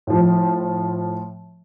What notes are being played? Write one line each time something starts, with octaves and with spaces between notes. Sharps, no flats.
A2 F3